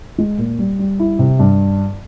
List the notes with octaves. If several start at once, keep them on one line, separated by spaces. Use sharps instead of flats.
G#3
A#2
G3
G3
E4
C3
G2